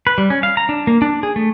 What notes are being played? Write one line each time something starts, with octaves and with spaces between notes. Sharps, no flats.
B4
G3
C#4
F5
A#5
D4
A#3
D4
G#4
A3